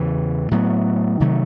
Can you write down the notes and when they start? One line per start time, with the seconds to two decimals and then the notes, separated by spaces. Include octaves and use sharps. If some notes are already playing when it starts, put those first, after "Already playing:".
Already playing: E2 C#3 E3
0.51 A2 F#3 B3
1.20 C3 D#3 F#3 A3